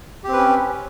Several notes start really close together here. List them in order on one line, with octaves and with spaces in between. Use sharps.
G4 C4 B4 C#4